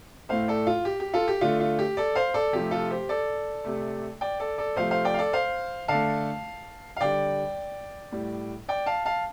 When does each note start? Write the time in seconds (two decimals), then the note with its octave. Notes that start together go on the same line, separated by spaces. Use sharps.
0.29 A2 A3 C5 F5
0.48 A4 D5
0.67 F4
0.85 G4
1.00 G4
1.14 F4 A4
1.28 G4
1.41 D3 A3 F4
1.60 F4
1.79 G4
1.97 A4 D5
2.15 C5 F5
2.34 A4 D5
2.53 C3 F3 A3 G4
2.71 F4 A4
2.90 G4 C5
3.09 A4 D5
3.64 C3 A3
4.21 D5 G5
4.40 A4 D5
4.58 A4 D5
4.76 C3 F3 A3 C5 F5
4.91 C5 F5
5.05 D5 G5
5.14 F5
5.19 A4 D5
5.33 C5 F5
5.88 D3 A3 F5 A5
6.97 F5
7.01 D3 G3 D5 G5
8.12 A2 G3
8.69 D5 G5
8.86 F5 A5
9.05 F5 A5